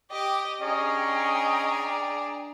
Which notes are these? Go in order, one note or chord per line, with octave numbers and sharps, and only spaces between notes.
G4 D#5 G5 D6
C#4 D4 G#4 D#5 G5 A#5
D5